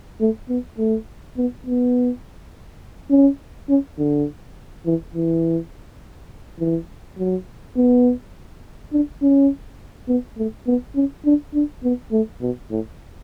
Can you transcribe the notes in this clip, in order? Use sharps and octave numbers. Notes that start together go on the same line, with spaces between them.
A3
B3
A3
B3
B3
C#4
C#4
D3
E3
E3
E3
F#3
B3
D4
C#4
B3
A3
B3
C#4
D4
D4
B3
A3
B2
A2